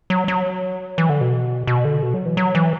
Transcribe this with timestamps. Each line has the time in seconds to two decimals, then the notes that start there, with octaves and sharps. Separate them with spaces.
0.10 F#3
0.28 F#3
0.98 E3
1.09 D3
1.21 B2
1.67 B2
1.85 D3
2.03 B2
2.14 F#3
2.26 E3
2.37 F#3
2.55 E3